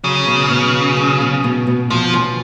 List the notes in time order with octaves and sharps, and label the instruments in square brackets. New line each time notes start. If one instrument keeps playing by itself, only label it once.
[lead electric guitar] C#3 [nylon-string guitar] F#3
[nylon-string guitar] B2
B2
F#3
C#4
B2
B2
B2
[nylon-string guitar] B2 [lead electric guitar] F3
[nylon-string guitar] C#4